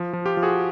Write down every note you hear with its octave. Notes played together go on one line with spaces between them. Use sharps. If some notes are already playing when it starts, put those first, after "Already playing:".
Already playing: F3
F3
F4 G4
F3
F#4 G#4